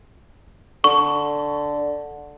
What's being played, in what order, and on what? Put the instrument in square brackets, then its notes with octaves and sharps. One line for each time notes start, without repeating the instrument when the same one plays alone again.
[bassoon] D3 [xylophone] C#6